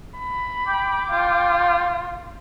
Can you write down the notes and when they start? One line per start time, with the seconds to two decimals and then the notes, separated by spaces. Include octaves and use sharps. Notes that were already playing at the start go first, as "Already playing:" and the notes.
0.18 B5
0.66 G5 D6 G6
1.10 F4